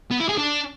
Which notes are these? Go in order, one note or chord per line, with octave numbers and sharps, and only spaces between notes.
B3
E4
G#4
D4